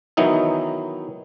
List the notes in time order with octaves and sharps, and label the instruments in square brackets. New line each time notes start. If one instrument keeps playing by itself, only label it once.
[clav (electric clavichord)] D#3 E3 F#3 B3 D#4 E4